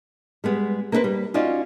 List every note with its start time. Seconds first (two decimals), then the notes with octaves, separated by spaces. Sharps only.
0.44 G3 G#3 B3
0.92 A#3 D4 D#4 G#4 B4 C5
1.04 G3
1.34 C#4 D#4 F4 F#4 D5